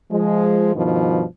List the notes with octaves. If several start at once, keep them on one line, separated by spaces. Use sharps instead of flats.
F3 G#3
G2 B2 D#3 F3